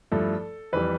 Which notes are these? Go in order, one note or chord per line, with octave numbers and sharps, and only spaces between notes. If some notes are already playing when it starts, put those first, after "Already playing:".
G2 F3 A3 E4 A4
F2 E3 G3 B4